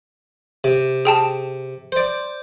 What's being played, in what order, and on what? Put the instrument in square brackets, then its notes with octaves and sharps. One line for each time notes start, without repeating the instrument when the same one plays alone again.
[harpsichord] C3
[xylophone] G#4 G5 A5
[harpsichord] C5 D5